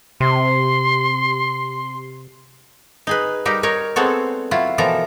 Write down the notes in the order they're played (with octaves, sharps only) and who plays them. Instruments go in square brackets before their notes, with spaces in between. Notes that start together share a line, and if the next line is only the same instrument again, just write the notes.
[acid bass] C3 [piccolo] C6
[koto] D#4 G#4 B4
G3 D#4 G4 A#4
D#4 A#4 C#5
G#3 B3 C4 A4 C#5
F#3 E4 F4
B2 E3 F3 A4 A#4 A#5